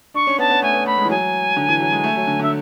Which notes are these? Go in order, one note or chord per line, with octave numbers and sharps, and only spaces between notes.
D4 C#6
C#4
B3 A5
B3
A3 G#5
B3
A3 B5
G#3
E3
F#3 G#5
D3
E3
F#3
G#3
A3
F#3
D3
D3 E5